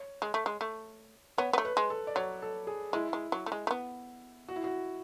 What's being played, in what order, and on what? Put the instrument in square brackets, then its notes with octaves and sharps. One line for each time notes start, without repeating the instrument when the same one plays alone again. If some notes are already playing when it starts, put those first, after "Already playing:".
Already playing: [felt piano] C#5
[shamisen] G#3
A3
G#3
A3
[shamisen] B3 [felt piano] C#5
[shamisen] B3
A3
[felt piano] B4
[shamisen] G#3
[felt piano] A4
D5
[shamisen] F#3 [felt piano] C#5
[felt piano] A4
G#4
[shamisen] G#3 [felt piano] E4
[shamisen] G#3
F#3
A3
G#3
A3
B3
[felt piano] F#4
E4
F#4